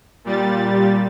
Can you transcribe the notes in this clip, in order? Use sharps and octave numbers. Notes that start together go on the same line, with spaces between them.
A#2 G3 A6